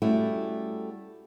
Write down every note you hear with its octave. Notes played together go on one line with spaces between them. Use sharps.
G3 A3 C#4 E4 F#4